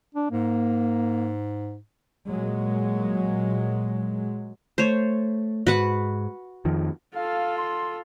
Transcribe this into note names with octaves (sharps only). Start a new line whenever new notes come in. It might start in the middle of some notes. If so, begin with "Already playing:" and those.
D4
G#2 A#3
A#2 F#3 G#3
A3 C5 C#5
G#2 F#4 B4 F#5
F2 D#3 F3
F4 A4 F5
C6